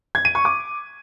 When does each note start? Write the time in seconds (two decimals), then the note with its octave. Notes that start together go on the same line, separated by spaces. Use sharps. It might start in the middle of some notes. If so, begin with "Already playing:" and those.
0.15 G#6
0.25 D#7
0.35 C#6
0.45 D6